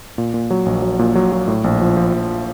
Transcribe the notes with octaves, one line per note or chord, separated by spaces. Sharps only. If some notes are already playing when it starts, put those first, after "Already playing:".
A#2
A#2
F#3
A#1
F#3
A#2
F#3
F#3
A2
A#1
F3
F3
A#1